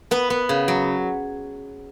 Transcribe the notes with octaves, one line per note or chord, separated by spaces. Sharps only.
B3 B4
B3
C#3
F#3